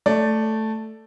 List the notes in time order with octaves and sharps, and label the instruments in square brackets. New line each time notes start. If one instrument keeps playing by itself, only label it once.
[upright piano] A3 D5